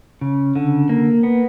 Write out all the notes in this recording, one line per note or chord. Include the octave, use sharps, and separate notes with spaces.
C#3
D3
A#3
B3